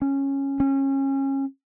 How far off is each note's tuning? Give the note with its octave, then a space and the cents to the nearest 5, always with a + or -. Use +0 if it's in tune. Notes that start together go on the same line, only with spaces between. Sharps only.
C#4 -10
C#4 -25